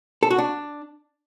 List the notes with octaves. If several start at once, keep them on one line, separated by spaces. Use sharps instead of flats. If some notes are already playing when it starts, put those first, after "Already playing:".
A4
F#4
D4